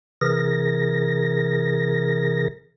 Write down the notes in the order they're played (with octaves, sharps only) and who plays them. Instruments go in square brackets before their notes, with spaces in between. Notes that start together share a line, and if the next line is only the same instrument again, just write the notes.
[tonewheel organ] C3 E3 G#4 A#4 A#6